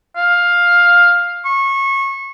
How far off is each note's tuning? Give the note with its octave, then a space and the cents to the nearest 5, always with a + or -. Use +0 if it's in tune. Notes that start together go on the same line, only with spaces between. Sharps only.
F5 +10
C#6 -25